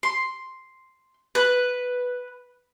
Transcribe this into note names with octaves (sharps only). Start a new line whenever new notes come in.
C6
B4